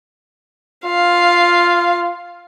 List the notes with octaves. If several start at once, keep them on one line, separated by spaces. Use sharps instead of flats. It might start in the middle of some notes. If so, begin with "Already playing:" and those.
F4 F5